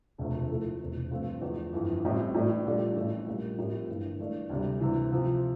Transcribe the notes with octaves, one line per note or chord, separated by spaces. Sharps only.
E1 D2 C3 F3 A3
A#2 F3 A3 E4 A4
E1 E2 C3
G2 F3 A3 C4 F4
E2 D3 F3
G1 F2 E3
A1 A2 G3 C4
A2 E3 A3 D4
A#1 A#2 G3 D4 A4
A1 A2 E3 A3
A#1 A#2 G3 A#3
A2 F3 C4 G4 A#4
G1 G2 E3 A#3
G2 E3 A3 D4
D2 C3 G3
D2 C3 E3
C3 F3 C4